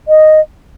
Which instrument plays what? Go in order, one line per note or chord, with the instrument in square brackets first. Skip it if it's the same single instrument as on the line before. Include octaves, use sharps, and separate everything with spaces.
[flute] D#5